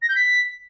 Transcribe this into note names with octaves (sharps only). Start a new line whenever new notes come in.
A#6
G6
B6